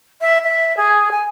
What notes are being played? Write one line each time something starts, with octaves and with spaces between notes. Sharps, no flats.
E5
E5
G#4
G#5